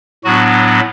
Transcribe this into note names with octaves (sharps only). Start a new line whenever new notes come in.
A2 F#3 B3 D4 F#4